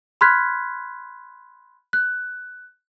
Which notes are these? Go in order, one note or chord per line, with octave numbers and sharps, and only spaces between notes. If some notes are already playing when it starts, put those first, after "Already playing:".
B5 C6 F6 F#6 G#6 B6
F#6